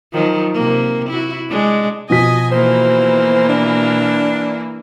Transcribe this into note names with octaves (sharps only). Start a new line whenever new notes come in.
D#3 F3 F#3
C3 A#3
E4 F#4
G#3 D4
B2 F3 D#5 G#5 B6
E3 A#3 C5
D4